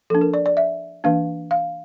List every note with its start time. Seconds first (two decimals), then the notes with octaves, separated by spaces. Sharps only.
0.10 F3 A#3 D4 A4
0.21 A#4
0.34 D5
0.46 D5
0.57 E5
1.04 E3 A#3 D4 F5
1.51 F5